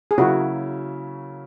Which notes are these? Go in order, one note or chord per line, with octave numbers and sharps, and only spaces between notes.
G#4
C#3 F#3 A#3 E4 F#4